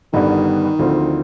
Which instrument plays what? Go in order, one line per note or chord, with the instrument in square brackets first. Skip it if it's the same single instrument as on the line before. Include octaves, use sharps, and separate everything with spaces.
[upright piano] G1 G2 D3 G3 B3 [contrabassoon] D#3
[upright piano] D2 D3 F3 C4 F4